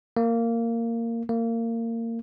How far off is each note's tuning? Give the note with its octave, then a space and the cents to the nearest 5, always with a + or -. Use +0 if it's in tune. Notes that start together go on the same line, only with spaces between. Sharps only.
A#3 -15
A#3 -25